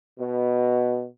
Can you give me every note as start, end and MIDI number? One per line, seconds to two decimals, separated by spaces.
0.18 1.06 47